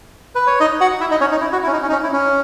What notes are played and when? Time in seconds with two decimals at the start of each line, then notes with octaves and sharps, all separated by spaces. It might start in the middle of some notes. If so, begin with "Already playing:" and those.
0.35 B4
0.47 C#5
0.60 D#4 D#5
0.81 F#4 F#5
1.00 E4 E5
1.11 D#4 D#5
1.21 C#4 C#5
1.31 D#4
1.41 E4
1.52 F#4
1.63 E4
1.67 C#4
1.73 D#4
1.82 C#4
1.89 D#4
1.92 C#4
2.03 E4
2.13 C#4